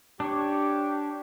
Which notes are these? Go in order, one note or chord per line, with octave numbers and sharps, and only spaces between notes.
D4 G4 C#5